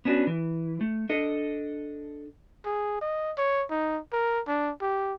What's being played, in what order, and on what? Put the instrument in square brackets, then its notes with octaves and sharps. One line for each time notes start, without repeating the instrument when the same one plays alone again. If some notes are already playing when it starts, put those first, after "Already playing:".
[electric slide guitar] B3 C#4 D4 E4 F#4
E3
A3
D4 A4 D#5
[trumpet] G#4
D#5
C#5
D#4
A#4
D4
G4